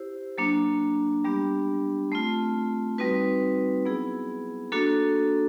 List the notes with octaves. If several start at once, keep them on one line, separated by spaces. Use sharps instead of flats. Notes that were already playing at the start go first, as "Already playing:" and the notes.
Already playing: E4 G4 C5
F#3 A#3 D4
G3 B3 D4 G4
A3 C4 F4
G3 C4 D#4 F#4 B4
F#3 B3 E4 G#4
A#3 D4 F#4 A4